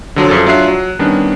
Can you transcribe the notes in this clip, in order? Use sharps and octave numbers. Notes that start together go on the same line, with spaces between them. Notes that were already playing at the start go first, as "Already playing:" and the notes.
D3 F3 F#3 D4
F#2 F3 G#4 A4 A6
F#3 D4 F4 E5 F#6 C7
F#3
D#3 G3 B3 C#4 D4